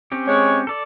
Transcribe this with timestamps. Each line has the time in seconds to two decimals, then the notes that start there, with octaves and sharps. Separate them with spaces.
0.12 C4 C#4 G4
0.27 G#3 C#5
0.67 A4 D5